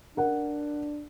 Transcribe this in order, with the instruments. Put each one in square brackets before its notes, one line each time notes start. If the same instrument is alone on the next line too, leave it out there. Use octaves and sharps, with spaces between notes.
[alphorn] D4 [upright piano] A#4 F#5